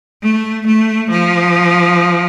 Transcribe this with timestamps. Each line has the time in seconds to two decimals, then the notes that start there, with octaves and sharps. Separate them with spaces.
0.23 A3
0.67 A3
1.11 F3